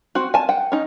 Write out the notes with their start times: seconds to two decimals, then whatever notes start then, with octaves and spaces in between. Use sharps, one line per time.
0.15 C4 F#4
0.34 G#5 A5
0.49 F#5 G5
0.72 C#4 D#4